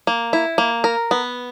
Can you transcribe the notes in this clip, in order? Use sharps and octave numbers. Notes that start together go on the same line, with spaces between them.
A#3
E4
A#3
A#4
B3